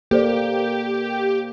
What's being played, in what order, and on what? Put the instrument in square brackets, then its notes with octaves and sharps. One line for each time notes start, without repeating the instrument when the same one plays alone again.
[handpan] A#3 [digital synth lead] G4 [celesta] A4 C5 D5